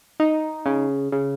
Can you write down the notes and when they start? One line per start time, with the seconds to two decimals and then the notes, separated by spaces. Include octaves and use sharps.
0.20 D#4
0.66 C#3
1.12 C#3